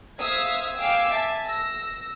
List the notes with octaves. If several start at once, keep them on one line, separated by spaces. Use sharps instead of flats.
C5 E5 F5 D#6 E6 G#6
F5 G5 G#5 D6 E6 C7
E5 G#5 A5
E6 A#6